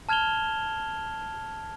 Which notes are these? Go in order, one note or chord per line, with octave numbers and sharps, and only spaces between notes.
A5 F6 G#6 E7 F7 G7